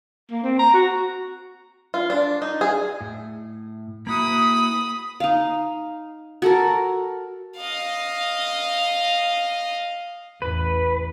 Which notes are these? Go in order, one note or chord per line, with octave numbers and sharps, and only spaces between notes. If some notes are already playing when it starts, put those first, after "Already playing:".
A#3
C4
A#5
F#4
F4
D4
D#4
G#4
A2
A#3 E4 F#4 B5 D#6
D#4 F5
F#4 A4 A#4
D#5 F5
A1 E2 B4